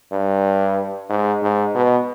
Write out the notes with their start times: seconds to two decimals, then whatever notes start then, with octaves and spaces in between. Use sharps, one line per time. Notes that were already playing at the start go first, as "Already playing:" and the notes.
0.12 G2
1.10 G#2
1.42 G#2
1.75 B2